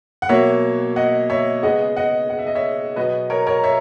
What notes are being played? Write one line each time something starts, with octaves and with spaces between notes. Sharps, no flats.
F#5
B2 F#3 A#3 C#5 E5
D#5 F#5
C#5 E5
C#3 G#3 B3 D#5 F#5
D#5 F#5
F#5
E5
D#5
C#5 E5
B2 F#3 B3 B4 D#5
A#4 C#5
A#4 C#5
C#5 E5